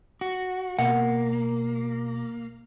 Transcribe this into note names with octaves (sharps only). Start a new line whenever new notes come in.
F#4
B2 A#3 F#5